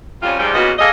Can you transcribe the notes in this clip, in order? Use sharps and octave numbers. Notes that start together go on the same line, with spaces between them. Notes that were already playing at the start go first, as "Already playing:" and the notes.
F2 G3 C#4 F4
G#2 F3 G3
E2 A#2 C#3 B3 F#4 D#5
A#3 G#4 A4 D#5